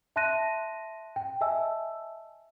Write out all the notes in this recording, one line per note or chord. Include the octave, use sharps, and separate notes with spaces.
E5 A5 C6 F#6 A#6 D#7
G5
D#5 E5 G#5 A5 E6